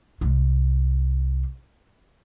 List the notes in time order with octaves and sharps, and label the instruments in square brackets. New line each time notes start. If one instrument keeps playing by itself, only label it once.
[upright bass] C2 G#3